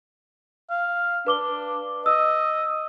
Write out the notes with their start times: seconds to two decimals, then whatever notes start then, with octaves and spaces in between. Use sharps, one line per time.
0.70 F5
1.27 D4 B4 D6 G7
2.06 D#5 E6